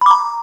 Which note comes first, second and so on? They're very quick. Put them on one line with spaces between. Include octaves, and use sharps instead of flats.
B5 D6 A#5